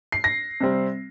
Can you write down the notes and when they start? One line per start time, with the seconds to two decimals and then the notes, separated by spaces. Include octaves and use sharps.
0.12 C7
0.24 A#6
0.60 C3 G3 C4